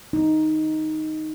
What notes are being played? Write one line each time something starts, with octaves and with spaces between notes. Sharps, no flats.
D#4